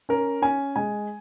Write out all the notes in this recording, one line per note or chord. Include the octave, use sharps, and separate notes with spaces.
C#4 A#4
C#4 G#5
G#3 G#5